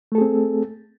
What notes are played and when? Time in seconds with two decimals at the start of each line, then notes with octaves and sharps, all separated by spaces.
0.12 A3
0.15 A4
0.18 G#4
0.21 C4